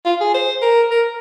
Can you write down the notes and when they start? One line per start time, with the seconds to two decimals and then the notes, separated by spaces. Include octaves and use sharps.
0.06 F4
0.21 G#4
0.34 C5
0.62 A#4
0.91 A#4